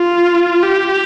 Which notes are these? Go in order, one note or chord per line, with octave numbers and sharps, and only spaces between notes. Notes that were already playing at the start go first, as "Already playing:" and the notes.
Already playing: F4
G4